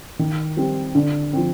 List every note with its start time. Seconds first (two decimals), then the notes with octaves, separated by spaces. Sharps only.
0.19 D#3
0.57 G3 C4 G4
0.95 D3
1.33 F3 C4